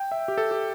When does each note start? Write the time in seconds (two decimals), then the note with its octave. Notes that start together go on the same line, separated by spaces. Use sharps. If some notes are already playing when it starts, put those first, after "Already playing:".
Already playing: G5
0.12 E5
0.28 G4
0.38 A4
0.51 G4